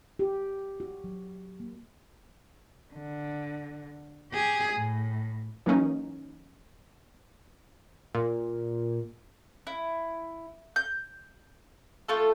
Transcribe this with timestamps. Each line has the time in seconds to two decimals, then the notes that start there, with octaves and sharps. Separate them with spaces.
0.19 G4
0.80 F#4
1.04 F#3
1.60 A#3
2.94 D3
4.32 G4 G#4
4.73 A2
5.66 E3 F#3 A#3 C#4 D#4
8.15 A#2
9.67 E4
10.76 G6
12.08 A3 F4 A4